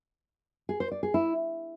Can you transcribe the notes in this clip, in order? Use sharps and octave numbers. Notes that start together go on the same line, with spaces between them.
G#4
C5
D5
G#4
E4